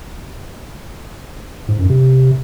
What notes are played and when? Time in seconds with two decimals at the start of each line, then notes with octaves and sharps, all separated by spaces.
1.69 G#2
1.79 F#2
1.90 C3